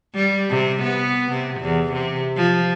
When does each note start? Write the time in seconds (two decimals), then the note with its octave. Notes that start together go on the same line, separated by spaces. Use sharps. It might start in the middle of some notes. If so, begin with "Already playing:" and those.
0.15 G3
0.50 C3
0.83 B3
1.32 C3
1.61 E2
1.93 C3
2.36 F3